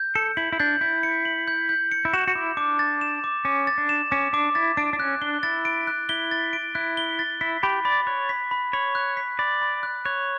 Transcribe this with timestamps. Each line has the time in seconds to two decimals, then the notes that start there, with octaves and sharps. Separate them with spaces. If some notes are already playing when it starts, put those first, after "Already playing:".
Already playing: G6
0.15 A4 C#7
0.37 E4 F#7
0.52 E4
0.60 D4 G6
0.81 E4 G6
1.03 C#7
1.25 F#7
1.48 G6
1.69 G6
1.92 C#7
2.05 E4
2.13 F#4 E7
2.28 F#4
2.35 E4 D6
2.57 D4 D6
2.79 A6
3.01 E7
3.24 D6
3.45 C#4 D6
3.67 A6
3.78 D4
3.89 E7
4.11 C#4 D6
4.33 D4 D6
4.55 E4 A6
4.77 D4 D7
4.93 D4
4.99 C#4 F#6
5.22 D4 G7
5.43 E4 A6
5.65 D7
5.87 F#6
6.09 E4 G7
6.31 A6
6.53 D7
6.75 E4 F#6
6.97 G7
7.19 A6
7.41 E4 B6
7.63 G4 B5
7.85 D5 B5
8.07 C#5 F#6
8.29 B6
8.51 B5
8.73 C#5 B5
8.95 F#6
9.17 B6
9.39 D5 B5
9.62 B5
9.83 F#6
10.05 C#5 F#6